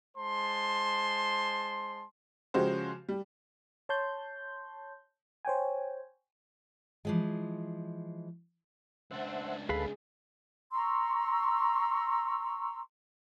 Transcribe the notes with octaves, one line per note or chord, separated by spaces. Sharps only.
G#3 C5 A5 C6
C#3 F3 G#3 F#4 G4 C5
G3
C#5 A5 C6 G6
C5 C#5 G5 G#5
E3 F3 G#3
C#2 D4 C5 E5 F#5
D2 G#4 A4 B4 F5 B5
A#5 C6 C#6 E6